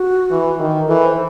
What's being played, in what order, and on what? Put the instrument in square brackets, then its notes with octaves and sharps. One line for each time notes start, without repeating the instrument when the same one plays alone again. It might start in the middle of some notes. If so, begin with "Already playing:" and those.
Already playing: [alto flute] F#4
[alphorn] E3
D#3
[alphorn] E3 [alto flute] A4
[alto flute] C5